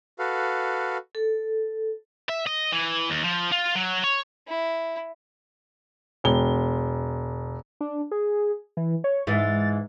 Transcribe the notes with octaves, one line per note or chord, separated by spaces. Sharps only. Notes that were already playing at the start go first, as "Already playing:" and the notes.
F#4 A4 B4 F5
A4
E5
D#5
E3
D#2
F3
F4
F#3
C#5
E4
E1 G7
D4
G#4
E3
C#5
G#2 E3 A6